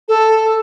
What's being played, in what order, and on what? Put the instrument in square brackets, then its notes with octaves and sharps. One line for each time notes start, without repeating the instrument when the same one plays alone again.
[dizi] A4